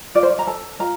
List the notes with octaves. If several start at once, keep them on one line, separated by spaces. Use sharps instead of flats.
F4 D5
C5
D5
A#5
A4 A5
F4 A#5